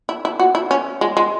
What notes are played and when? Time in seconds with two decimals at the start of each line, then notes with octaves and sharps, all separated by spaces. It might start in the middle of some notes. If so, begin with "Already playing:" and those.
0.09 E4
0.25 E4
0.40 F#4
0.55 E4
0.71 C#4
1.01 G#3
1.17 G#3